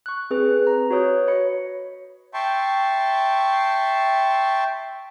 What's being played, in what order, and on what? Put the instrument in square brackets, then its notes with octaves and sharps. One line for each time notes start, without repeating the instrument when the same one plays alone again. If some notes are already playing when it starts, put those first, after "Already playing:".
[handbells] C#6 F#6
C4 G#4 B4
A#5
F#4 B4 C#5 D#6 G6
C#5 D#5 B5 C#7
[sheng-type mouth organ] E5 G5 A5 C6 C#6